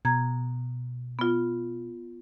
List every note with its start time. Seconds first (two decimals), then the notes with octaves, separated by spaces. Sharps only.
0.05 B2 A#5 G#6
1.19 B3 F4